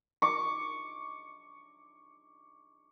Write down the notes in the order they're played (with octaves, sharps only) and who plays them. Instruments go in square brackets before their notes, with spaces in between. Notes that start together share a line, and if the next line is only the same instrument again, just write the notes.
[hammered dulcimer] C#6 D6